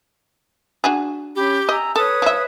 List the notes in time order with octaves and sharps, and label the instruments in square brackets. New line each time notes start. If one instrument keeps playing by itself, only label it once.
[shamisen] D4 F#4 G#4
[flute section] C#4 B5 [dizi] G4
[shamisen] D#5 [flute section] G#5 A#5 E6
[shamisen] A4 [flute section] B4 C#5 [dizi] D#6
[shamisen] F3 E5